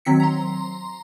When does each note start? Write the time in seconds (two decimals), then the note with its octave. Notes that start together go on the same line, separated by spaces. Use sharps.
0.05 D#3 F#3 C4 B6 C#7
0.20 A#5 C6